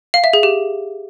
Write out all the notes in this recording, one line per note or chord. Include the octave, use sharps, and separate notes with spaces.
F5
E5
G#4
G4